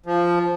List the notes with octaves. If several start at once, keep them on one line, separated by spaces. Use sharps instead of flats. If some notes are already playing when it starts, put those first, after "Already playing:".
F3